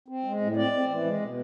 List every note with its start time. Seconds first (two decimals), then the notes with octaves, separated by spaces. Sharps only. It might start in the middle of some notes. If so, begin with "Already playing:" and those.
0.08 C4
0.24 G#3
0.41 A2
0.56 C4 D5
0.72 C4
0.88 E3
1.04 G#3
1.20 B2